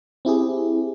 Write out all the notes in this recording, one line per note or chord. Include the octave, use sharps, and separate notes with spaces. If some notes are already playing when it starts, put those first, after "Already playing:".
C4 E4 G4 G#4